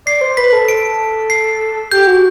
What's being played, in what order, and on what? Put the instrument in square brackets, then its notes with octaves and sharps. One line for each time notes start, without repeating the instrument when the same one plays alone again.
[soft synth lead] D5 [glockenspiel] C7
[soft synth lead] C5
[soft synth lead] B4 [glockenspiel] B6
[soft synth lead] A4
[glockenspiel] D7
C7
[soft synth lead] G4 [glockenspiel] G6
[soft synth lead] F#4